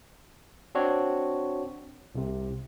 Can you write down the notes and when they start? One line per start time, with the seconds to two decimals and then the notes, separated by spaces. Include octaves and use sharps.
0.75 C4 D4 F#4 C#5
2.15 C2 C3